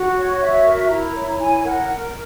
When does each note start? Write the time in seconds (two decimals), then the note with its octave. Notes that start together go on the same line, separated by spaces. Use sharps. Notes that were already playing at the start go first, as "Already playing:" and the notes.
Already playing: F#4 F#5
0.16 C#5
0.41 F#4 E5
0.65 A#4
0.89 E4 A#5
1.14 C#5
1.39 E4 G#5
1.64 A#4 F#5